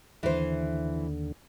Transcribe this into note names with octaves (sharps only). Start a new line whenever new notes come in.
D#2 D3 E3 C5